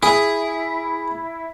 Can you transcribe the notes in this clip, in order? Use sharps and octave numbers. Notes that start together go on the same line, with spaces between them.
E4 G#4